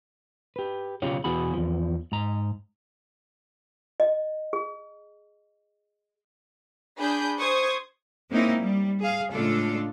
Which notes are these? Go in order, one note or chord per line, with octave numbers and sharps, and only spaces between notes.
G4 B4
B1 C#3 C#4 F4 G4 C#5
E2 B2 E3 F#4 G#4 B5
E2 F3
G#2 A#5
D#5
G#4
D4 G#4 B5 G6
C5 C#6 D#6 G#6
G#3 A#3 C4 C#4 D#4 E4
G3
G#4 F5
A2 C#3 G#3 D4 F4 A4